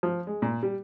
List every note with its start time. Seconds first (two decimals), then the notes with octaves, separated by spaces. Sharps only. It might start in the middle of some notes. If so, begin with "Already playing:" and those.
0.03 F3
0.27 G#3
0.42 A#2
0.63 G3